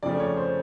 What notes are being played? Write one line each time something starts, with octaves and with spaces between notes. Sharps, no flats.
F2 C#3 F3 A3 D5
C#5
C5